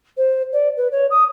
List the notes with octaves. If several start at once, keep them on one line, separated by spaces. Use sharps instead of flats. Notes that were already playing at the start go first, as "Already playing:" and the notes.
C5
D5
B4
C#5
D#6